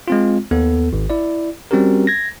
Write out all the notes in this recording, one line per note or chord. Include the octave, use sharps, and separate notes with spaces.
G#3 C4 F4
D#2 B3 A4
G#1
E4 D5
G3 C4 C#4 F#4 G4 A#4
G#6 A#6